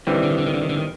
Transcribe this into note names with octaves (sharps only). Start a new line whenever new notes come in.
D3 E3 G3 C4
D#3
D3
D#3
D3
D#3
D3
D#3
D3
D#3